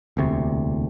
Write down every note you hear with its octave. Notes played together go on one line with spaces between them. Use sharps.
E1 D2 C3